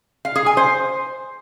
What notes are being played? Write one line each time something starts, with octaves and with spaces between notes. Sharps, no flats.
F5
G#4
G#5
C5